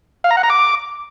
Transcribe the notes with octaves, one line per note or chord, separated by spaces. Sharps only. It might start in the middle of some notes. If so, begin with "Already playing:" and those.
F5
A#5
F#5
A#5
D6